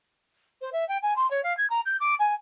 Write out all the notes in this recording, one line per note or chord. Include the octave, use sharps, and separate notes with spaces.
C5
E5
G5
G#5
C6
C#5
F5
G#6
A#5
G6
D6
G#5